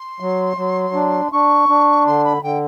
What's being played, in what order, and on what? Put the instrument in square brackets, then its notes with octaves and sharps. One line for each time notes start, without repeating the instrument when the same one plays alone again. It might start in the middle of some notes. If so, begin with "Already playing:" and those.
Already playing: [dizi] C6
[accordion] F#3
F#3
D4
[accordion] D4 [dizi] C#6
[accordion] D4
[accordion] D3 [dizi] C6
[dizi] B5
[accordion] D3 [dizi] G5